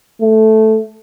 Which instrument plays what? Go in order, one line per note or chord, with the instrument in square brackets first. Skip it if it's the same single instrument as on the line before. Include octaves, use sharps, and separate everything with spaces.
[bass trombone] A3